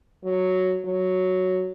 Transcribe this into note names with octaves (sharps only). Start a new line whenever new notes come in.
F#3
F#3